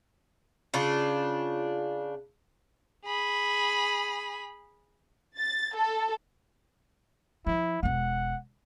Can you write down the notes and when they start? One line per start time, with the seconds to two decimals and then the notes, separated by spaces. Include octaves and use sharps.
0.74 C#3 D4 F4
3.05 G#4 B5
5.37 A6
5.75 A4
7.46 F3 E4
7.83 E1 B3 F#5